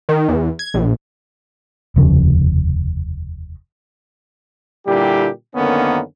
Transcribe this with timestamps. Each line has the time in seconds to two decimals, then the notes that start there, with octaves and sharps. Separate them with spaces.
0.09 D#3
0.29 E2
0.59 G#6
0.74 A#1
1.96 F1 D#2 C#3 F3
4.86 A#2 D3 G3 E4 G4
5.55 F#2 D3 D#3 A#3 B3 C#4